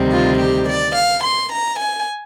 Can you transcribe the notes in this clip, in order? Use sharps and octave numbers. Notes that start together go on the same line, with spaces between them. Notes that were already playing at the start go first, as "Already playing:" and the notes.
Already playing: D2 C3 D#3 G3 C4
F4
G4
D5
F5
C6
A#5
G#5